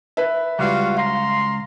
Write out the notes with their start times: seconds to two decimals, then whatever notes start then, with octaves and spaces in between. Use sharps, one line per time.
0.17 B4 E5
0.59 C#2 G3 F4 F#4 F5
0.96 F5 A#5 C6